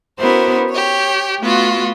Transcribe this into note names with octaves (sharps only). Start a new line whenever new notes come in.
B3 C#4 E4 F#4 A#4 C5
G4 C#5
A3 B3 F4 F#4